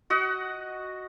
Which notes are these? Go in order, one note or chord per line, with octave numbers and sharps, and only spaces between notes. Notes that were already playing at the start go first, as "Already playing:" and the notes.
F#4 D#5 F#5